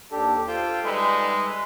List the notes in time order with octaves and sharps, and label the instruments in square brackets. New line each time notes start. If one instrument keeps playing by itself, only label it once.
[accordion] D#2 D4 A4 [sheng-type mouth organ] G4
[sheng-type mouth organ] F4 C5 G5 [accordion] A4
[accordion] G3 [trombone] G#3 [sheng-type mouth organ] D#4 B4 E5